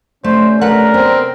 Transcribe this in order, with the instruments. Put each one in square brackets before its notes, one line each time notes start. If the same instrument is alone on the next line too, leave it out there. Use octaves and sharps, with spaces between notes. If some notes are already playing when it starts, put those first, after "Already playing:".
[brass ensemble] C3 C#4 D5 [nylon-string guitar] A3 [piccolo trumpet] C5
[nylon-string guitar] A3 B4 F#5 [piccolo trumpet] A#4
[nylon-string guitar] B3 [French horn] C4